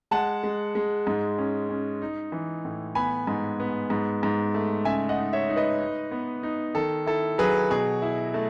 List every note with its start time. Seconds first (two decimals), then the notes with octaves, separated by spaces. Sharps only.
0.11 G#3 F#5 A5
0.44 G#3
0.75 G#3
1.07 G#2
1.38 C#4
1.70 C#4
2.02 D#4
2.32 E3
2.65 A2
2.95 B3 G#5 B5
3.27 G#2
3.60 B3
3.90 G#2
4.23 G#2
4.54 A3
4.85 C#3 E5 G#5
5.09 D#5 F#5
5.18 D#4
5.33 C#5 E5
5.49 D#4
5.56 B4 D#5
5.80 D#4
6.11 B3
6.43 D#4
6.75 D#3 A4
7.06 E4 A4
7.38 F#3 G#4 B4
7.70 B2 G#4
8.02 E4
8.34 A3